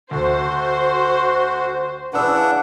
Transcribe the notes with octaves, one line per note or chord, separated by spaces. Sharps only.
D2 F#4 C5
C#3 E3 D4 B4 F#5 E6